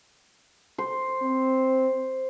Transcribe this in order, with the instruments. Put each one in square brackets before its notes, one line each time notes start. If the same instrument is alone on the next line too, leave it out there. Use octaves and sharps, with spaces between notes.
[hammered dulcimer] C5
[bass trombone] C4